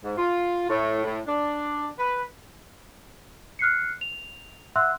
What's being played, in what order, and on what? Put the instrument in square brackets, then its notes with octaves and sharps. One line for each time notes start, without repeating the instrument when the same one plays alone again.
[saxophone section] G#2
F4
A2
A2
D4
B4
[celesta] F6 F#6 C7 C#7
F7
E5 F#5 C6 E6 F#6